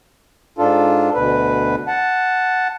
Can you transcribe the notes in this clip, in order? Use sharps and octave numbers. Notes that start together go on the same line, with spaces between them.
G#2 D4 F4 A4
D2 B2 B4
F#5 A5